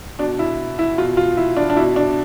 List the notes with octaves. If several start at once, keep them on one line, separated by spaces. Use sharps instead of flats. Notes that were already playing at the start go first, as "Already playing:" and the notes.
B2 D4
E4
E4
B2 F4
F4
E4
D4
D4
B2 E4
D4